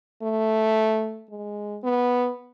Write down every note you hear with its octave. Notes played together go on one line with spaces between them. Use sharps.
A3
G#3
B3